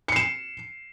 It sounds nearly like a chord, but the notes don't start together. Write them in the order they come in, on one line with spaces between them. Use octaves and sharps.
C#7 C7 E7